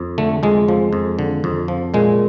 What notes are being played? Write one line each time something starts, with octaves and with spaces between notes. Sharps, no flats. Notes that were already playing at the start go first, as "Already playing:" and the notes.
Already playing: F2
D3 A3
F2 G#3
F3
F2
D3
F2
F3
A#2 G#3